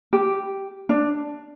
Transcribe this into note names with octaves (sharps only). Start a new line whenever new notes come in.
G4
D4